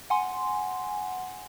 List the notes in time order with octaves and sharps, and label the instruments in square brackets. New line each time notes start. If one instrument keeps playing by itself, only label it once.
[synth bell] F#5 G#5 C6